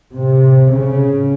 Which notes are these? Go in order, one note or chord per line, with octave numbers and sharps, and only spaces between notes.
C3
C#3